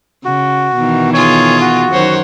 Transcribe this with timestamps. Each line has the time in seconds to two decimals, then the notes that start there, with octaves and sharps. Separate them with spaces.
0.25 C#3 F#4
0.76 B2 D#3 E3
1.13 F4 G#4 C#5
1.61 F#4
1.91 F#2 D#3 C5 C#5 F#5